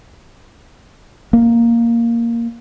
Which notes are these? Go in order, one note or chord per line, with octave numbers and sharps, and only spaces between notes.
A#3